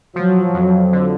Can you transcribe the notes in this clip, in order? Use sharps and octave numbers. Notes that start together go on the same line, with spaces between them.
F3 F#3
F2
D3